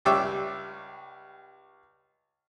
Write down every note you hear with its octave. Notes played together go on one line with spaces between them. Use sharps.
C#2 G3 G4 C#5 E5 D6